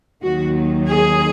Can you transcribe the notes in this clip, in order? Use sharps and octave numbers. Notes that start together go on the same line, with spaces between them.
D#2 D#3 F#3 A#3 F#4
G#4